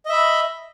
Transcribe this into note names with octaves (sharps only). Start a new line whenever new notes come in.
D#5 E5 B5